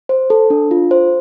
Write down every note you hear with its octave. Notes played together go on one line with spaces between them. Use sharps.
C5
A4
D4
F4
C5